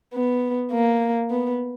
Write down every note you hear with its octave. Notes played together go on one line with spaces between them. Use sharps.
B3
A#3
B3